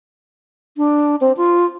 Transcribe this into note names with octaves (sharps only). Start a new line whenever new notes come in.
D4
C4
F4